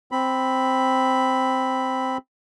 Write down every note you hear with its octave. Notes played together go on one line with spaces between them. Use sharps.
C4 B5